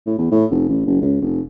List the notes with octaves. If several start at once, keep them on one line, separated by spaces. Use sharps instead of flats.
A2
E2
A2
F1
A1
F#1
C#2
F1